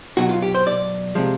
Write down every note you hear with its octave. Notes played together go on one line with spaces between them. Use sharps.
B2 F#3 F#4
F4
G4
C5
D5
C3 F3 G#3